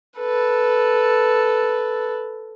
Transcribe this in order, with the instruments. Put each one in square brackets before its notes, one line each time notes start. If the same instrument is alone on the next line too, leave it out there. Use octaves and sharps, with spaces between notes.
[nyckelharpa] A4 B4